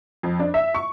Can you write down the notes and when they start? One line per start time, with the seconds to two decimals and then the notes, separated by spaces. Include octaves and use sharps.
0.23 F2
0.39 D4
0.54 E5
0.75 C#6